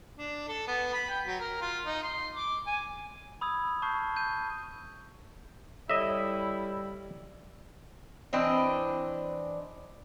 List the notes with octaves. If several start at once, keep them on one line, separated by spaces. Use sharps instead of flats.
D4
A4
B3
B5
G5
F#3
A#4
F4
D#4
C6
D6
G#5
B5 D#6 E6 G#6
A5 C#6 F6 G6 C7
G6 D#7
G3 E4 A4 C#5 D#5 E5 A#6
E3 C4 D4 D#5